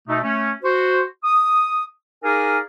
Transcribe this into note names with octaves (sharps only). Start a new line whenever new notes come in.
B2 A3 D#4
A3 C#4
F#4 C5
D#6
D#4 G#4 A#4 D5 F5 G#5